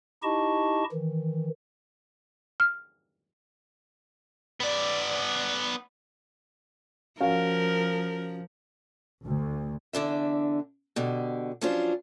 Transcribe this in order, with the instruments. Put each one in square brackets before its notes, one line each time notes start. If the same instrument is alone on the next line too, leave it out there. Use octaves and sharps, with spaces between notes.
[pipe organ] D#4 E4 G4 D#5 A5 C#6
D#3 E3
[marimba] F6
[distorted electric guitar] B3 D5
[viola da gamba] F3 [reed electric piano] C#4 F#4 [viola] A#4 [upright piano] F5
[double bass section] D2
[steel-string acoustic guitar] E2 D3 D4 E5
B2 D3 G4
F3 F#3 C#4 D4 F4 C5